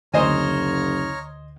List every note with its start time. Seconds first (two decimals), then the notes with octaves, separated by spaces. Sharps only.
0.14 F#1 D2 C5 C#5 D#5 G#5 A#5 F6